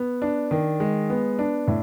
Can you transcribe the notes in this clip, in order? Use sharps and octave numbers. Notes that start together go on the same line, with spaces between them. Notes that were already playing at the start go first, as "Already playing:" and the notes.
Already playing: B3
D4
D#3
G#3
B3
D4
A2